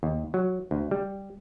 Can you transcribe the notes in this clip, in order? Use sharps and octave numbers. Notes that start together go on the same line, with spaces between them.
D#2
F#3
D2
G3